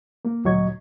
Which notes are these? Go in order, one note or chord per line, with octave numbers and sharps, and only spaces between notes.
A#3
D2 A#2 F#3 D#5 C#6 G#6